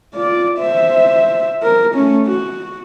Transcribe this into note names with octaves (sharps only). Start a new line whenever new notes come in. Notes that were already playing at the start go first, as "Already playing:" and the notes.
F4 D5
C5 E5
A#4
A3 C#4
F#4